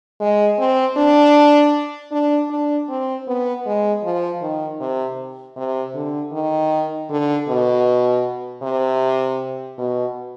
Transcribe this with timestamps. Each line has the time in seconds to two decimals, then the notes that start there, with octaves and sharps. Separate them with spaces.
0.21 G#3
0.59 C4
0.97 D4
2.12 D4
2.51 D4
2.89 C4
3.27 B3
3.66 G#3
4.04 F3
4.42 D#3
4.80 C3
5.56 C3
5.94 D3
6.33 D#3
7.10 D3
7.48 B2
8.62 C3
9.78 B2